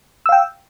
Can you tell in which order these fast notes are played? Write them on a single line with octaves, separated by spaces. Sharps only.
E6 F5 G5